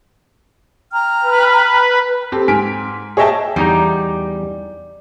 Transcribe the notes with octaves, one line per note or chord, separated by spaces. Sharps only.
G5 A#5 F6
B4
C4 G4 A4
G#2 G#5 F6 B6 D7
G#4 C#5 D#5 E5 G5 A5
E2 G3 D#4 A#5